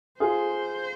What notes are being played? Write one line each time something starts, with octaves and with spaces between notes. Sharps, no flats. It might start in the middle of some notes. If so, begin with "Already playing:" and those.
F4 G#4 C5